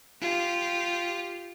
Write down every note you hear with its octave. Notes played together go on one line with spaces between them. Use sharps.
F4 G4